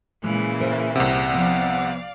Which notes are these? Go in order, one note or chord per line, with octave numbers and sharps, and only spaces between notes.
A#2 C#3 E3 G#3
A#4 C5 E5
C2 C3 F#5
F3 B3 D5 F5